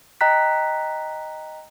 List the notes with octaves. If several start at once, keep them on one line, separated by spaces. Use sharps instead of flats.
D#5 G5 A#5 F#6 B6